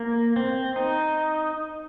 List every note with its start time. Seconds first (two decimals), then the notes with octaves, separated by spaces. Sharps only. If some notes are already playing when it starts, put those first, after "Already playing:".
Already playing: A#3
0.36 C4
0.76 D#4